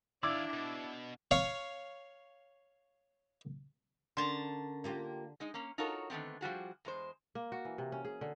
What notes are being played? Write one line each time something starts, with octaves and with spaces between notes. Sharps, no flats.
D#3 D4 E4 D5 F5 D6 E6 G#6
B2
C#5 F5
D3 C#4 A#4 A5 A#5 C6
A#3 F4 G4
G#3 D#4 D#5
A#3 C#4
D#4 F4 F#4 A4 A#4 C#5
D3 D#3 A3 B3 C4
F3 G3 F#4 G#4
E2 G#3 C5
A#3
F#4
E3
C3
C#4
G#4
D3